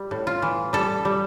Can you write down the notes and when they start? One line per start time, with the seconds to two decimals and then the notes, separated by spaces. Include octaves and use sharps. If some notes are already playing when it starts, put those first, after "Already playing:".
Already playing: G3
0.11 A2
0.27 F4
0.42 E3
0.73 G3 A4
1.05 G3